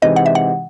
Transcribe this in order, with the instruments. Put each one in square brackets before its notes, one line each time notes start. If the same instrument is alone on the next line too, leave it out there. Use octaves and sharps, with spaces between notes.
[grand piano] C3 E3 G#3 C4 D#4 [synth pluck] D#5
[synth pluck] F#5
E5
F#5